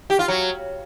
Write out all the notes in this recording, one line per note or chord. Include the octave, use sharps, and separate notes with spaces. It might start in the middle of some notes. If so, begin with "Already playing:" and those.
G4
F4
F#3